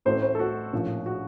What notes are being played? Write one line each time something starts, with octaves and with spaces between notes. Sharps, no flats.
A1 A2 A3 C4 F#4 C5
C5
A4
F#4
A#1 A2 F3 A#3
F#4